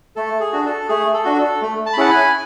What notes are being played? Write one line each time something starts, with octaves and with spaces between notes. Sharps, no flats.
A3 A4
G#4
D4 F#4
A4
A3 G#4
A4
D4 F#4
A4
A3
A5
B5
C#4 E4 G#4 F#5 A5
G#5 B5